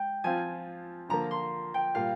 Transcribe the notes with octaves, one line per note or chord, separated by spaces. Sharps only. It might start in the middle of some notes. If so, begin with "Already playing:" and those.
Already playing: G#3 G5
F3 C4 F4 G#5
D3 F3 A#3 A#5
C6
G5
A#2 G3 A#3 F4 F5